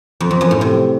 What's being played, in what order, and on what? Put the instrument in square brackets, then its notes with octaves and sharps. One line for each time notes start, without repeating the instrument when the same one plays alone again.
[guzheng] F2
F2
F#2
A2
C3